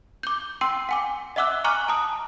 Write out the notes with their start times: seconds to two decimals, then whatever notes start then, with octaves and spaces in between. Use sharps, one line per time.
0.23 D6 G6
0.61 G5 C6 E6 D#7
0.89 F#5 G#5 D6
1.36 D#5 E5 F#5 D6 E6 F#6
1.64 G#5 A#5 C#6 D6 F6 F#6
1.88 A5 A#5 D#6